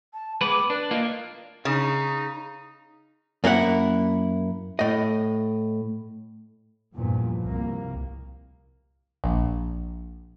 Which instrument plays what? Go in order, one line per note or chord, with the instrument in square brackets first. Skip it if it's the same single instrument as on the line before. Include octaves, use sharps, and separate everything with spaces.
[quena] A5
[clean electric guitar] G#3 B3 B4 [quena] D6
[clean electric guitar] D4 [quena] B4
[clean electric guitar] A#3 F4 [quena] D#5
[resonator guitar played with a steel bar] C#3 [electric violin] D#4
[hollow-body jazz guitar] F#2 A#3 E4 G4 F#5
A2 D#5
[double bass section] E2 G2 A#2 F3
C2 A#3
[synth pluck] A#1